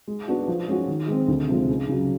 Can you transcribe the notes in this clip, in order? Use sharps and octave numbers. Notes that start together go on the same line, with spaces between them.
G#3
B3 D4 F#4
F3
G#3 C#4 F#4
D#3
G#3 C4
D2
C3 F3 G#3
C#2
C#3 F#3